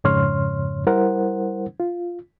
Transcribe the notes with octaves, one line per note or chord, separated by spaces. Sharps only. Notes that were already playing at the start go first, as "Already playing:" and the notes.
F2 G#2 C#3 C#5 C6 F6
G3 E4 A#4 C5 F#5
F4